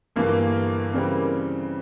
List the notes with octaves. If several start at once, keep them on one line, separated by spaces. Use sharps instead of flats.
G1 G2 E3 A#3
C#3 E3 G3 C4